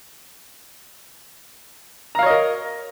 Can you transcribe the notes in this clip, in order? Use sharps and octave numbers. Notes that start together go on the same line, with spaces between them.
A#4 C#5 D#5 F5 A#5